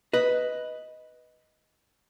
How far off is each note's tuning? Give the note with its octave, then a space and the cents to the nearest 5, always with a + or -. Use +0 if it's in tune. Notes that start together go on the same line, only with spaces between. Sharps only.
B4 +0 D#5 +5